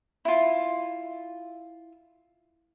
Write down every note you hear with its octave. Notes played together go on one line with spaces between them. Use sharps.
E4 F4